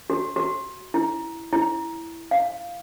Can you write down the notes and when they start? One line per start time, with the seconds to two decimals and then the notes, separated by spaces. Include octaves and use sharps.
0.10 F#4
0.36 F#4
0.94 E4
1.53 E4
2.31 F5